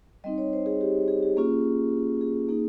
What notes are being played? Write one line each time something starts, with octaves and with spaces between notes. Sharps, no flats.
G3 C4 D#4 D#5
C#5
C5
G#4
G4
G#4
G4
A#3 C#4 F4 G#4
G#4
A#3 D#4 G#4